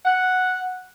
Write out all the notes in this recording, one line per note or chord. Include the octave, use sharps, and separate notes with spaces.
F#5